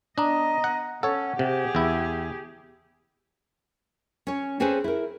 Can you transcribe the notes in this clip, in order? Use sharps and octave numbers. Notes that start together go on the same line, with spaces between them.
B3 D4 D#5 A#5 D#6
F#5
C#4 A4 C#5 F#5
C3 G4 G#4
E2 E4
C#4 C#5
C4 C#4 G#4 A4 B4 C5
E4 A#4